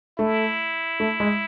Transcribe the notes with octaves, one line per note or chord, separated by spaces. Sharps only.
A3 E4
A3
G#3